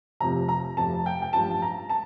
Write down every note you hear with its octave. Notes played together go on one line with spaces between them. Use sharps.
F1 F2 C3 F3 A#5
A#5
F1 F2 C3 F3 A5
G5
G5
A1 G2 F3 A5
A#5
A5